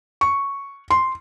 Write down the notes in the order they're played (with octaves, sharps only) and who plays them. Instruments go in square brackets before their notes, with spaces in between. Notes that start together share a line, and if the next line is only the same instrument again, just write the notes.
[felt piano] C#6
C6